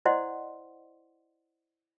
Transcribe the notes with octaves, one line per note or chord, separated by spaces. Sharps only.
E4 C5 D5 D#5 F#5 C6